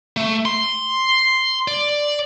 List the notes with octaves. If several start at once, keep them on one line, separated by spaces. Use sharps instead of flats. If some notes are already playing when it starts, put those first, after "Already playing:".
A3
C6
D5